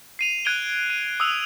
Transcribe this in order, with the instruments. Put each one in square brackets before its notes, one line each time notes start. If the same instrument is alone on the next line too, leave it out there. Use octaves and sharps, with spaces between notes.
[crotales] C7 D#7 F7
F#6 G#6 D7 D#7 F7 G7
D#7
D#6 E6 F7